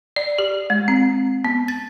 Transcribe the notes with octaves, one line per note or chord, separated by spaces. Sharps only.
D5
G4
G#3
C4
B3
A6